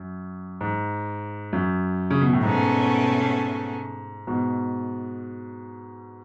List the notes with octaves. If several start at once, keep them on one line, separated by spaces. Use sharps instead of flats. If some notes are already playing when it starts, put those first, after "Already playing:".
Already playing: F#2
G#2
F#2
C#3
B2
A2
G#2 B2 A3 C#4
G#2 B2